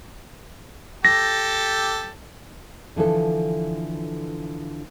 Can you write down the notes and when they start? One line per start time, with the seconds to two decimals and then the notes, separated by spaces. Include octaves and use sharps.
1.05 G4 A4 A#6
2.96 D3 E3 F3 A4